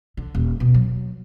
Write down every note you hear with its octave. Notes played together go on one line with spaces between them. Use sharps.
D3
D#1
B2
F#3